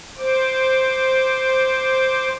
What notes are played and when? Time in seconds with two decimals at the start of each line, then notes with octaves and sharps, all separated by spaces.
0.17 C5 D6